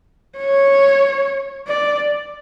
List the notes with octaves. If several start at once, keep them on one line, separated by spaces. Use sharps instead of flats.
C#5
D5